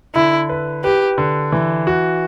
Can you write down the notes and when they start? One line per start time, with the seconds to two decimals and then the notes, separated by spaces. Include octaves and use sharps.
0.15 D3 E4
0.49 B4
0.84 G4 B4
1.18 D3
1.52 E3
1.87 F#4